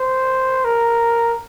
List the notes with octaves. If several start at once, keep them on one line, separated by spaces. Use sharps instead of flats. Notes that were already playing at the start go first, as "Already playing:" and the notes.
Already playing: C5
A#4